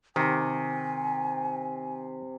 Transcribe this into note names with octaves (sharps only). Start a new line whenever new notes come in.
C3 D#3 G#5